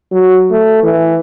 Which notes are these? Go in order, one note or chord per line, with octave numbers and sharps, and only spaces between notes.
F#3
A3
E3